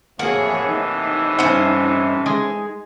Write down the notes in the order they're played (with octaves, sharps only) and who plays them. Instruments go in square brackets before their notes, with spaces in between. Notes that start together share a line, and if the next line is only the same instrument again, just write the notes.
[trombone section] A2 C3 E3 [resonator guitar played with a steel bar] A#3 F#4 [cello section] G#4 C#5 [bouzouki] F#5
[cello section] D#4
[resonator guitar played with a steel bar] G2 F#5 [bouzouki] C#4 C5
[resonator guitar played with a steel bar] G#3 G#4